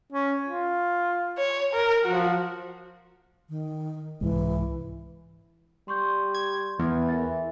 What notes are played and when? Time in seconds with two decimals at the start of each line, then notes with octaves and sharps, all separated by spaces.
0.13 C#4
0.45 F4
1.38 C#5
1.74 A#4
2.06 F3 F#4
3.49 D#3
4.21 C2 G#2 E3 G#3
5.88 G3 C6 C#6 G6
6.35 G#6
6.79 E2 E3
7.09 A#4 E5 A6